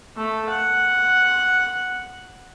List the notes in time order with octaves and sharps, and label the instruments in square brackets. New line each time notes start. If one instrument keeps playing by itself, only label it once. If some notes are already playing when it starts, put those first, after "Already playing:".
[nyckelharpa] A3 A4
F#5